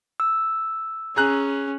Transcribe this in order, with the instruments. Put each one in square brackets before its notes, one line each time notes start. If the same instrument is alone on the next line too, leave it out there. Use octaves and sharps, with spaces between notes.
[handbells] E6
[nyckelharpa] C#4 [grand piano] G#4 A#5 F#6